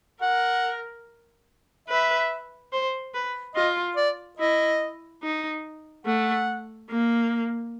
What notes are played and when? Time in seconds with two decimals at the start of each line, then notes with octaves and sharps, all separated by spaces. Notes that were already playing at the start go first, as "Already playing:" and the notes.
0.22 A#4 F#5
1.89 B4 E5
2.72 C5
3.14 B4
3.56 F4 D#5
3.97 D5
4.39 E4 D#5
5.22 D#4
6.06 A3 F#5
6.89 A#3